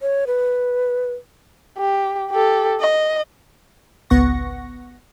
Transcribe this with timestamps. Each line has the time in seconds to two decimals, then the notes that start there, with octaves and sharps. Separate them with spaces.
0.02 C#5
0.27 B4
1.78 G4
2.30 G4 A4
2.81 D#5
4.10 G#1 C#2 B3 F#5 C#6 A#6